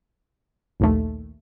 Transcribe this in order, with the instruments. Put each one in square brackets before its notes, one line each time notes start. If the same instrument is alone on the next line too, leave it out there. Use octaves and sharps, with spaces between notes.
[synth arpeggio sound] A#1 D#2 A3